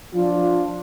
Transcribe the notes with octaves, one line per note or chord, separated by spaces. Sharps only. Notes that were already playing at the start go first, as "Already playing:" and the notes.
F3 D4 F4